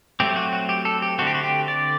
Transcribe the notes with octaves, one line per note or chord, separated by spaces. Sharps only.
F#3 A3 C4 G4
F#4
F#4
G4
A4
G4
D3 A3 C4 F#4
G4
F#4
G4
D5